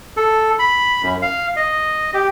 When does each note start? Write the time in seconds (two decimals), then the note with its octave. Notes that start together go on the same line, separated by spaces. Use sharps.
0.17 A4
0.59 B5
1.03 F#2
1.22 F5
1.56 D#5
2.14 G4